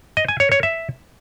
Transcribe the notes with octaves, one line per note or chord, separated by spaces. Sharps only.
D#5
G#5
C#5
C#5
E5